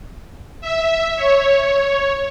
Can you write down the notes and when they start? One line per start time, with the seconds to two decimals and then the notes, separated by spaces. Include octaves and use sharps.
0.61 E5
1.16 C#5